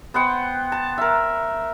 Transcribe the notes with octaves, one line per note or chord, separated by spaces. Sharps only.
B3 C5 F#5 G5
A5
A#4 E5